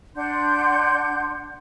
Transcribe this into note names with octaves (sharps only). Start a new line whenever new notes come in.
D4 F#5 C6 G6